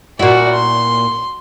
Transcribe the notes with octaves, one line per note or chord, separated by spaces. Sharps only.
A#2 E4 F#4 D5
C6